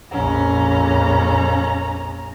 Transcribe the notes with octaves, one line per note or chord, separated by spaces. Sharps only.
A#1 F2 C#4 A#5